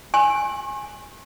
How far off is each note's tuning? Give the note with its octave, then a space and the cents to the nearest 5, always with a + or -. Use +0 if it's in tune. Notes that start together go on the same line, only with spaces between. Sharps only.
G#5 +0 C#6 -45